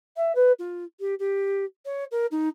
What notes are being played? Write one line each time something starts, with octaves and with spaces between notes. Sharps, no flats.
E5
B4
F4
G4
G4
C#5
A#4
D#4